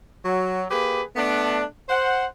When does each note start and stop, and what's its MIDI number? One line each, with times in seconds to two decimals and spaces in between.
0.24 0.64 54
0.71 1.01 58
0.71 1.01 67
0.71 1.01 68
0.71 1.01 71
1.16 1.63 57
1.16 1.63 59
1.16 1.63 62
1.88 2.26 72
1.88 2.26 78